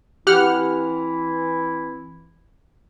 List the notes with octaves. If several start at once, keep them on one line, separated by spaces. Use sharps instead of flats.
E3 C4 E4 G4 F#5 F6